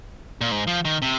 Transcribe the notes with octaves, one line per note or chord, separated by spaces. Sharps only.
A#2
G#2
F3
D#3
C3